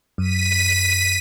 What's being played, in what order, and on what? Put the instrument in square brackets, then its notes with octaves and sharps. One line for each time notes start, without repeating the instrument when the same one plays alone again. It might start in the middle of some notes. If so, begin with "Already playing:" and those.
[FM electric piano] F#2 [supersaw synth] B6 D#7